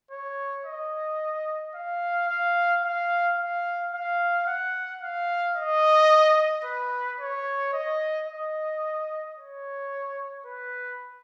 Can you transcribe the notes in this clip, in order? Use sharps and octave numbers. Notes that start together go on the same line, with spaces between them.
C#5
D#5
F5
F5
F5
F5
F5
F#5
F5
D#5
B4
C#5
D#5
D#5
C#5
B4